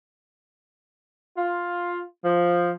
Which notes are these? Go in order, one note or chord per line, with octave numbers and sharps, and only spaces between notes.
F4
F3